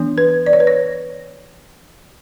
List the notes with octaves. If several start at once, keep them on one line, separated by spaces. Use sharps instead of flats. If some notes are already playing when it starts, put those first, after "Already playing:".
Already playing: E3 B3 D4
B4
D5
C#5
B4
C#5